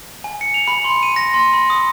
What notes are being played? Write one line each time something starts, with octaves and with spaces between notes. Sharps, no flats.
G#5
C#7
F7
B5
C6
D#7
A#6
C6
B5
D#6